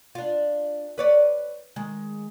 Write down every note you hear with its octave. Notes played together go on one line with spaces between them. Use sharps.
D4 F4
B4 C#5 D5
D#3 G#3